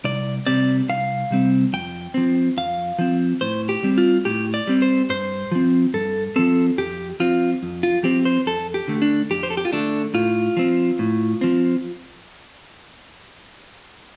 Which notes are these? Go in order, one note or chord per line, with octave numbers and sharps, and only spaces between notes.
C2 D5
C3 G3 C4 D5
C2 F5
C3 G3 C4
F2 G5
F3 C4
F2 F5
F3 C4
A2 C5
G4
G3 C4
F4
A2 G4
D5
G3 C4
C5
G2 C5
F3 C4
G2 A4
F3 C4 A4
F2 G4
F3 C4 F4
F2
F4
F3 C4 G4
C5
F2 A4
G4
D3 A3
D4
F2 G4
C5
A4
G4
F4
D3 A3 D4
A2 F4
F3 C4
A2
F3 C4